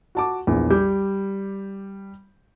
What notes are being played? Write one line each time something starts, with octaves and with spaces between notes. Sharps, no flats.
F#4 A5 D6
A#1 E2
G3 D6 G6